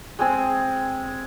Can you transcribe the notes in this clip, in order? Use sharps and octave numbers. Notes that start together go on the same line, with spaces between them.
G#3 C4 G#4